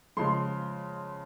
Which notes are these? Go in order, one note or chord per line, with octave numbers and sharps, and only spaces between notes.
C#3 F3 G#3 C6